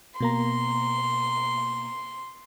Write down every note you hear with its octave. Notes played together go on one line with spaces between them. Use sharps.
B2 A#3 A#5 C6